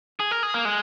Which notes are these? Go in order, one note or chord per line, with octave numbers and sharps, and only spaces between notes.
G#4
A#4
G#4
A#3
G#3